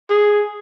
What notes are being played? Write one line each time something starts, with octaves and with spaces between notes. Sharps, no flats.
G#4